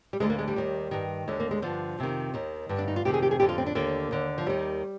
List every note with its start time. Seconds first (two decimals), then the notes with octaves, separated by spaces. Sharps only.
0.13 G3
0.20 D2 D3 G#3
0.30 A#3
0.39 G#3
0.48 G3
0.56 D#2 D#3
0.91 G2 D#3
1.28 D#2 D3 G#3
1.40 A#3
1.51 G#3
1.62 G2 D3 F3
1.99 F2 C3 D#3
2.34 D#2 D#3
2.69 G2 D3
2.78 D4
2.88 D#4
2.96 F4
3.05 F2 C3 D#3 G4
3.14 G#4
3.22 G4
3.31 G#4
3.40 F2 D3 G4
3.49 F4
3.58 C4
3.66 D4
3.75 D#2 D3 A#3
4.11 D#2 D3
4.38 F3
4.46 D#2 D#3 G3